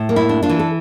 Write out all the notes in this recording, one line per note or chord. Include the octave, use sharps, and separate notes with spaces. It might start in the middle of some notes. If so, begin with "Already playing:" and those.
Already playing: A2
A#3
E4
D4
D4 F4
E3
A4